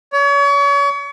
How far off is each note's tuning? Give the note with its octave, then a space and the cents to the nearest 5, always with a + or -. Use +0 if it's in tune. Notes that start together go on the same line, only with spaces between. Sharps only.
C#5 +35